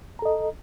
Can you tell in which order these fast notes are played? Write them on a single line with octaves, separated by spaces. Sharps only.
A#5 A4 D#5